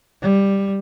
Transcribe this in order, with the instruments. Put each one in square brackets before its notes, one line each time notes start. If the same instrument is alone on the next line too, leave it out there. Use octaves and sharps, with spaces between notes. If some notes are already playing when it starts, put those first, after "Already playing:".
[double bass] G3